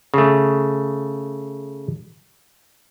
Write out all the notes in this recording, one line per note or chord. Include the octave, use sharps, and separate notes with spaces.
C#3 A3